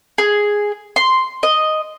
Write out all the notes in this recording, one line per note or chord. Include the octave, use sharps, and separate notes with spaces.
G#4
C6
D#5